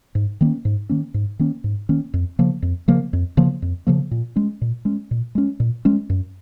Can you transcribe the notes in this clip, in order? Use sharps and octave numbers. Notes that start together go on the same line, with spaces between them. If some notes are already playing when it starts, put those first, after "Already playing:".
G#2
D#3 A#3 C#4
G#2
D#3 A#3 C#4
G#2
D#3 A#3 C#4
G#2
D#3 A#3 C#4
F2
C#3 F3 A#3
F2
C#3 F3 A#3
F2
C#3 F3 A#3
F2
C#3 F3 A#3
A#2
G#3 C#4
A#2
G#3 C#4
A#2
G#3 C#4
A#2
G#3 C#4
F#2